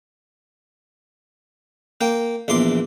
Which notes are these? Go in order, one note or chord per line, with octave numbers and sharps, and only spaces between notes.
A#3 G5
A#1 E2 C6 D6